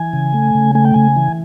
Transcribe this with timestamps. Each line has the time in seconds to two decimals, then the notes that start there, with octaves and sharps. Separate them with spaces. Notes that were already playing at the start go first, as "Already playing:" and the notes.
Already playing: E3 G#5
0.13 C#3
0.34 A3
0.55 C#3
0.75 A3 G#5
0.85 G5
0.94 C#3 G#5
1.16 E3